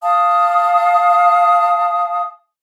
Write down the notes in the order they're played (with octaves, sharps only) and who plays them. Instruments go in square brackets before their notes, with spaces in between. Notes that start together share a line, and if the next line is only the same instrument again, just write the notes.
[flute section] F5 A5 D#6